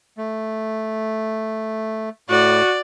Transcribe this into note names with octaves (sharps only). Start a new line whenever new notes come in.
A3
A2 F#4 D5